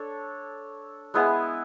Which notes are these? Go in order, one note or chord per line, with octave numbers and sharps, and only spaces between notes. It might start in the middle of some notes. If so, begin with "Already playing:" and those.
Already playing: D4 A4 C#5
G#3 B3 E4 G#4